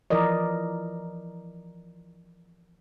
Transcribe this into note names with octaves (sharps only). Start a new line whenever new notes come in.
E3 F3 A#4 D5 D#5